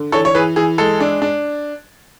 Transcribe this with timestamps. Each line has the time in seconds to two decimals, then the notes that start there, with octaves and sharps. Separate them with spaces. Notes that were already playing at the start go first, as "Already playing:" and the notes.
Already playing: D3
0.12 E3 A4 C#5
0.25 C#5
0.35 E3 G#4 B4
0.56 E3 G#4
0.78 G#3 A4
1.00 D4
1.22 D4